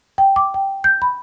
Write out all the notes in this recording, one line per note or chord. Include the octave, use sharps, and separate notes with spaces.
G5
D6
G5
G6
B5